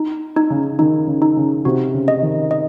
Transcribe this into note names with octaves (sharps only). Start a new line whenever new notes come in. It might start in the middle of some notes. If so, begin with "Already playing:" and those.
Already playing: D#4
D#4
C#3
D#3 D#4
C#3
D#4
C#3
C3 F#4
C#3
D#5
D#3
D#5